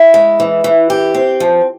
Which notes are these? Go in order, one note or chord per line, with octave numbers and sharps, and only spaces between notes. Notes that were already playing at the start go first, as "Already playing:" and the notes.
Already playing: E4
G#3
E3
E3
G4
C4
F3